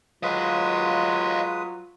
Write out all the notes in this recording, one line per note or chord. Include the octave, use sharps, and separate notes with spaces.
F#3 G#3 F4 B4 D#5 F5 D#6